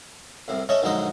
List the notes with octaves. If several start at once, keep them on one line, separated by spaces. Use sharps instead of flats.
C2 A2
A3 C#4 A4 C#5 D#5
A#1 F#2 D3 G#3 D#4 D#5